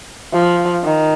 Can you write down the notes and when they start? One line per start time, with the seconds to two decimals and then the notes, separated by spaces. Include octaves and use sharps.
0.33 F3
0.84 D#3